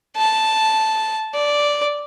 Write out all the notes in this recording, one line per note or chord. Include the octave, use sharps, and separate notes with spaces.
A5
D5